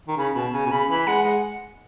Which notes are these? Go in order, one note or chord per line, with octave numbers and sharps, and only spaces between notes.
D#3
C#3 B5
B2 A5
C#3 G#5
B2
C#3 B5
E3 B5
G#3 F#5
G#3 F#5